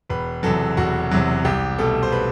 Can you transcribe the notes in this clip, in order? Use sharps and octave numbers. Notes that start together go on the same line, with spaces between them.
E1 B4
E2 C3 F#3 A4
E1 F#4
E2 C3 F#3
C2 G4
B2 A3 A4
C5
B4